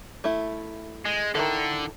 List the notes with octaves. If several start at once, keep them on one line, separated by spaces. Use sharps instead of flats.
A3 E4
G#3
D3 D#3 E4 A4